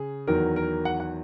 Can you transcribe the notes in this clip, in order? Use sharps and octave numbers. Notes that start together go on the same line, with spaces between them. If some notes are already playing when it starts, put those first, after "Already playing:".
Already playing: C#3 G#4
E2 D#3 F#3 A#4
A#4
F#5
F#5